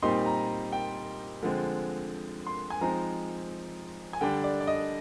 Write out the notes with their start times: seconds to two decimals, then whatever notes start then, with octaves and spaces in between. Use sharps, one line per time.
0.02 A#2 G3 C4 D#4 C6
0.26 A#5
0.72 G5
1.42 D3 F3 G#3 C4
2.46 C6
2.70 G#5
2.81 F3 G#3 C4 D#4 A#5
4.13 G#5
4.21 D3 G3 D4 G5
4.44 D5
4.61 D5
4.67 D#5